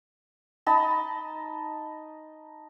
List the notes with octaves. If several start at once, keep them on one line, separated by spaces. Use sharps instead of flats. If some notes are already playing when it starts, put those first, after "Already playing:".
D#4 D#5 A5 B5